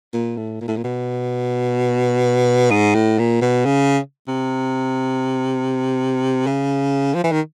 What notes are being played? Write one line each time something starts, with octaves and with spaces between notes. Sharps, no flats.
A#2
A2
A#2
A2
A#2
B2
G#2
A2
A#2
B2
C#3
C3
C#3
F3
E3
D#3